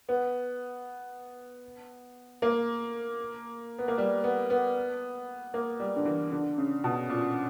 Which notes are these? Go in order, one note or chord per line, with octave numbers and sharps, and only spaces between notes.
B3
A#3
B3
A#3
G3
B3
B3
A#3
G3
D3
E3
D3
C#3
B2
A#2